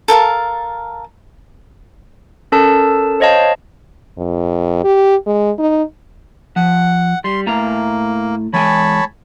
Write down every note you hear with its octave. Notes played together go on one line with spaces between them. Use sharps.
A4 A#4 F5 A5
C#4 A4 A#4 A5
C5 C#5 D#5 F5 A5
F2
G4
G#3
D#4
F3 F#5
G3 C6
A2 A3 A#3 A#5
E3 G#3 C#5 G#5 A5 B5